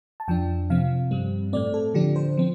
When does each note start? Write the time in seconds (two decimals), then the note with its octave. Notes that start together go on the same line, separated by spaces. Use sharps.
0.20 A5
0.28 F2 F3 D4 G5
0.70 C3 F3 C4 F5
1.11 G2 G3 C4
1.53 A2 A3 C4 D5
1.74 A4
1.94 D3 F3 D4 G4
2.16 C5
2.37 F3 C4